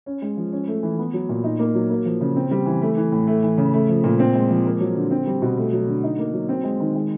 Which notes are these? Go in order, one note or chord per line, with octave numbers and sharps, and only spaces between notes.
C#4
G#3
F3
C#4
A3
E3
B3
F#3
A#2
D#4
A#3
F#3
A#3
F3
C#3
C4
G3
E3
A3
E3
A2
A3
E3
C#3
A3
F3
A#2
C4
G#3
F3
A#3
F#3
D3
C4
G3
B2
A3
F#3
D3
D#4
A#3
F#3
C4
G#3
D#3
G#3